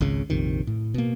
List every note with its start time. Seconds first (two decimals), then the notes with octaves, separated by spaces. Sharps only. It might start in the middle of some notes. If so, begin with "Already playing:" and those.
0.01 G#1 C#2 C#3
0.30 A#1 F2 C3 D#3
0.67 A2
0.94 B2 A#3